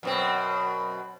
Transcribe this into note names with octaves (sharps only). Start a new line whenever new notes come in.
F#2 B2 C4